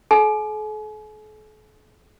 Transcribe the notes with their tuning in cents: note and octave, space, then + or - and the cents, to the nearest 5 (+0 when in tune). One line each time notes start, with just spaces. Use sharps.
A4 -45 G#5 +40